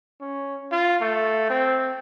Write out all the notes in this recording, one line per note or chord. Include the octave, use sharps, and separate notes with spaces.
C#4
F4
A3
C4